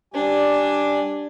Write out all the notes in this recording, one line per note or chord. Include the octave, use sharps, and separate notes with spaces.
G3 D4 G4 G#5